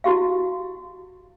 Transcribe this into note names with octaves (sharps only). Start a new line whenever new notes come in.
E4 F#4 G4 F5